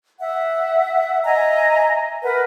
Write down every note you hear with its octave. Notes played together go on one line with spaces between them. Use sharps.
E5 F#5
D#5 E5 G#5 A#5
A#4 B4 F#5